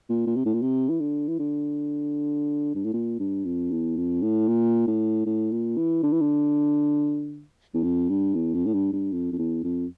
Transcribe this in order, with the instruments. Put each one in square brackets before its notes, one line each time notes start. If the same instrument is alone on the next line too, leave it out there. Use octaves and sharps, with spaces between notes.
[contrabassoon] A#2
A#2
C3
A2
A#2
C3
E3
D3
E3
D3
G2
A2
A#2
G2
F2
E2
F2
A2
A#2
A2
A2
A#2
E3
D3
E3
D3
E2
F2
G2
E2
F2
A2
G2
G2
F2
F2
E2
F2